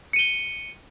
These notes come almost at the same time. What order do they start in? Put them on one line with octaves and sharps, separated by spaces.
C#7 D#7 G7